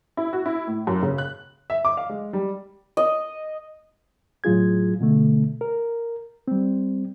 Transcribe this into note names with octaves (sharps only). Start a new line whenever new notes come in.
E4
F#4
E4
A2
F#2
C#3
F#6
E5
D6
F5
G#3
G3
D#5
A2 F#3 F4 G#4 G#6
B2 D3 A3
A#4
G3 C4